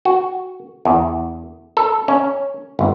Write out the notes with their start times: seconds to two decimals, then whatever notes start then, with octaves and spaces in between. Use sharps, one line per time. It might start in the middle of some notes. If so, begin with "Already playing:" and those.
0.05 F#4
0.85 E2
1.77 A4
2.08 C#4
2.79 G1